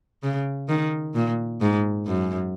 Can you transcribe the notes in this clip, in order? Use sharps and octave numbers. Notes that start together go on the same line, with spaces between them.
C#3
D#3
A#2
G#2
F#2